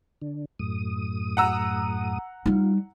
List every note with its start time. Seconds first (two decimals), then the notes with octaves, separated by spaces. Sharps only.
0.22 D3
0.59 F#2 A2 D#6
1.37 F#5 A#5 E6
2.46 G3 D#4 F4